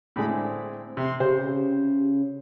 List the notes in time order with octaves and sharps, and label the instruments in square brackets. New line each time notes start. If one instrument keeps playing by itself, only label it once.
[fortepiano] A2 D3 G#3 [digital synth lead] B5
[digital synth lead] C4
[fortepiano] C3 [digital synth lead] C6
[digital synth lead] C#3 [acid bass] G4 [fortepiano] C5